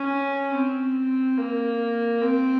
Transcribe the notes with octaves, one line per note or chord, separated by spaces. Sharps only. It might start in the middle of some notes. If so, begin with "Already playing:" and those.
Already playing: C#4
C4
A#3
C4